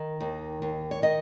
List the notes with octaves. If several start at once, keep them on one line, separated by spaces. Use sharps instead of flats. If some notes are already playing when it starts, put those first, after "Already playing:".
Already playing: D#3
D#2
D#2
C#5
D#3 D#5